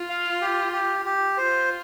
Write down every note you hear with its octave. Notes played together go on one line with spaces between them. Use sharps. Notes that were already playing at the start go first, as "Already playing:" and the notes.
Already playing: F4
F5
G4
G4
G4
F4 C5